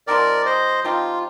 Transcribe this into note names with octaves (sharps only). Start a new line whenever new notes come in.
F3 C4 D#4 G4 A#4 D5
C5 D#5
F3 C4 D#4 F4 G4